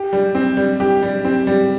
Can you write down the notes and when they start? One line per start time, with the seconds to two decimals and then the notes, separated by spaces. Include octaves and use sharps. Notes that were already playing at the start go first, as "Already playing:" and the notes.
Already playing: G4
0.13 G3
0.35 C4
0.57 G3
0.80 G4
1.03 G3
1.25 C4
1.47 G3